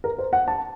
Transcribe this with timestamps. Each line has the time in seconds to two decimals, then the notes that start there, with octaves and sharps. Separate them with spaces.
0.04 A#4
0.19 C5
0.33 F#5
0.48 A5